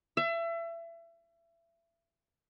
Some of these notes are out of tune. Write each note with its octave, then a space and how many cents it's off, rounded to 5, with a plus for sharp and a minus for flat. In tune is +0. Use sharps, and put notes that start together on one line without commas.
E5 +30